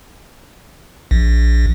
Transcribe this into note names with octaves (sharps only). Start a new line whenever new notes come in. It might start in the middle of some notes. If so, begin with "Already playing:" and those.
A#1